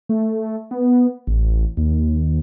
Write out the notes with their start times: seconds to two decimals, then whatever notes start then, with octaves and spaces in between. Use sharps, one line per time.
0.09 A3
0.71 B3
1.27 A1
1.77 D#2